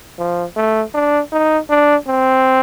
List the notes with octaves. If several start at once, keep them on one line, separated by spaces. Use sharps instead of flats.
F3
A3
D4
D#4
D4
C4